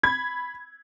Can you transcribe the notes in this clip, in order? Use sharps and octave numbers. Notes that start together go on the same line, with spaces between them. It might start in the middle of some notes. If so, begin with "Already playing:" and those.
B5 G#6